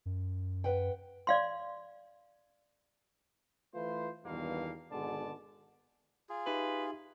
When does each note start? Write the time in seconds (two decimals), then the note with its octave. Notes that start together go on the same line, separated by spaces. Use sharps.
0.06 F#2
0.64 B4 F#5 G5
1.27 D5 F5 C6
3.74 E3 A3 F4 B4 C5
4.25 E2 G2 B2 D#3 A#3 F5
4.92 G#1 B2 D3 G#3 D5 A5
6.29 F4 G#4
6.46 D#4 G4 B4 E5